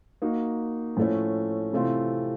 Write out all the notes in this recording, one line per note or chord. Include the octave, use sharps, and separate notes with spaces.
A#3 D#4 F#4
A2 F3 A3 C#4
C3 E3 A3 C4 F4